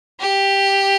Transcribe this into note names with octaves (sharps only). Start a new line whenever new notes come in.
G4